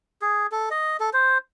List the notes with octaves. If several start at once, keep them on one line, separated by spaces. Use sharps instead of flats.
G#4
A4
D#5
A4
C5